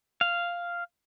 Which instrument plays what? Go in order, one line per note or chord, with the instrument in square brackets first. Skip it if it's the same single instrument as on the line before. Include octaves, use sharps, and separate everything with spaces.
[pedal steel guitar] F5